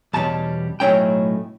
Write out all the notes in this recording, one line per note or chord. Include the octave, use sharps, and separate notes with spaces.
E2 B2 G3 C#4 A5
B1 A2 F#3 A3 C#4 G5